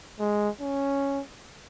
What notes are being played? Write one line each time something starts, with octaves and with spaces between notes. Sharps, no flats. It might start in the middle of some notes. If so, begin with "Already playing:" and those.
G#3
C#4